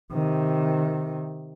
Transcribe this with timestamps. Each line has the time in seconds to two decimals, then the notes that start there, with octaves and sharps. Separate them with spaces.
0.12 C3 D#3